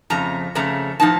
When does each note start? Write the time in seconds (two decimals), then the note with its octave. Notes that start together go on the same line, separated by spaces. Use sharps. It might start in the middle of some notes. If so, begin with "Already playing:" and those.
0.10 F2 C#3 A3 A#5
0.55 F2 C#3 A3 A#5
1.00 A2 F3 C4 D#4 A5